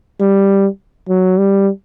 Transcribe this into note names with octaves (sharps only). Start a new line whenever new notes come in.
G3
F#3
G3